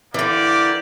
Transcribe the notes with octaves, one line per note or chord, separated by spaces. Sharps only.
D3 E3 A#3 G4 D5